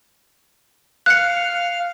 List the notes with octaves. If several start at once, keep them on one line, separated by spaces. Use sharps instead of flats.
F5 F#6 C#7